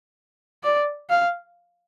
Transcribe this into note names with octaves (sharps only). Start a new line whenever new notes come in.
D5
F5